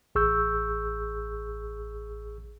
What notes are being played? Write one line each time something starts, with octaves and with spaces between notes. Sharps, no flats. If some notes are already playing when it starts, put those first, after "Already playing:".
A1 G#4 C#6 E6 G6